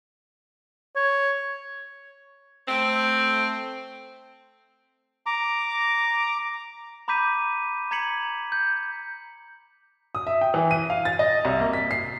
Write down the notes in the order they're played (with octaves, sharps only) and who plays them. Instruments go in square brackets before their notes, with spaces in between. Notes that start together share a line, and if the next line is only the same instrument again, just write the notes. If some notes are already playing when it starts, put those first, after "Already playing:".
[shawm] C#5
[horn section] A3 C4
[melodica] A#5 D6
[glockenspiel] A#5 B5 D6 G6 B6 D#7
A#5 G#6 B6 C#7 F#7
G6
[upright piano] D#6
E5
G5
E3
D#7
F5
A6
D#5
C2
A#3
B6
C7